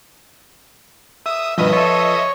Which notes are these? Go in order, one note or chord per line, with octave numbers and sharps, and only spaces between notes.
E5 D#6
G2 B2 D#3 F3 B4 D#5 E5 D#6
F4 A4 C#5